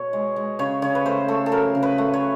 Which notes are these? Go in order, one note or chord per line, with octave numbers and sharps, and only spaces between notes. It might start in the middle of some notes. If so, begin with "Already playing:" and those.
Already playing: B2 C#5
G#3
G#3
C#3 C#5
C#3 C#5
B4
A3 C5
A3 A4
A4
F#3 A#4
C#3
B4
A3
C#5